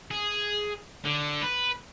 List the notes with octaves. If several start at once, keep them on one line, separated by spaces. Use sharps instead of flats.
G#4
D3
B4